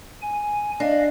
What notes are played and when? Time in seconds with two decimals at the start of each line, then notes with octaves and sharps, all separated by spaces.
0.22 G#5
0.80 D4 D#5 F5